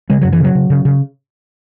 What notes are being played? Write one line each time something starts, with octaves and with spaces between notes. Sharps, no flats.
C#3 G#3
F#2 F#3
E3
C#3 F#3
C#3
C#3
C#3